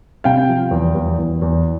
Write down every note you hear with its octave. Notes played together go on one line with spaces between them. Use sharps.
C3 F5 G5
F3
E2
E2
E2
E2